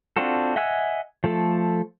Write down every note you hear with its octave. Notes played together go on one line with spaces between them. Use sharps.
C4 D4 F4 F#4 A4
D#5 E5 F#5 G#5 E6
F3 A3 A4